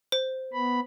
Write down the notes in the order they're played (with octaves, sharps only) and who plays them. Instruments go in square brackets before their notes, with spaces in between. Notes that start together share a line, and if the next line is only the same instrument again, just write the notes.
[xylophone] C5
[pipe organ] B3 B5